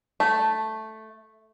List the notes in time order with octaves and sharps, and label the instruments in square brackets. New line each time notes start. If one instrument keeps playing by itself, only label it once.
[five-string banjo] A3